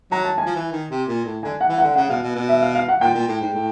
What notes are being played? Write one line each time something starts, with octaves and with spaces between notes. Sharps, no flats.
F#3 A#5
A5
G#5
F3
E3
D#3
C3
A#2
A2
D3 G#5
F#5
E3
D3 F#5
C#3 F#5
B2 F5
B2
B2
E5
F5
F5
F#5
A#2 G5
A#2
A2
G#2
A2